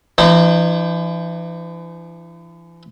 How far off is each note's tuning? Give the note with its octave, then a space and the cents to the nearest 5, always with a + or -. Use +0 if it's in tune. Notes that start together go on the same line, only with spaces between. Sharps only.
E3 +40 D#4 -30 C5 +0